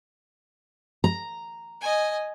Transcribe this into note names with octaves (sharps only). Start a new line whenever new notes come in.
A#5
D#5 G#5